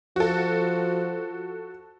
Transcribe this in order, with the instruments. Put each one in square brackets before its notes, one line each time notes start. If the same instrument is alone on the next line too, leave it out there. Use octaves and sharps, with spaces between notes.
[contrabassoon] F3 [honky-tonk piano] F#4 A4